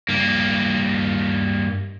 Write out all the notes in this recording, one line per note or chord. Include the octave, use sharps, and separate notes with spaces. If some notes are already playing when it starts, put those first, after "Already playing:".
G2 A#3